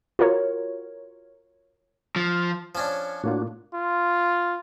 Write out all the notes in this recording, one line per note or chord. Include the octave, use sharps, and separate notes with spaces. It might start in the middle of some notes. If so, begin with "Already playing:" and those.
F4 F#4 A#4 C#5
F3
F3 C#4 D4 C#5
A2 A#3 D4 F4 F#4
F4